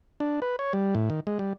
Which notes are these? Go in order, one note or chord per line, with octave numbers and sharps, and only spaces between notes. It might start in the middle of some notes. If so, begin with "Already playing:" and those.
D4
B4
C#5
G3
A2
D#3
G#3
G3